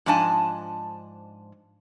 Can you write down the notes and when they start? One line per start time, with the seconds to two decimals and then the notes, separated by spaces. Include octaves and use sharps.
0.06 G#2 F3 D4 D#5 G#5 A5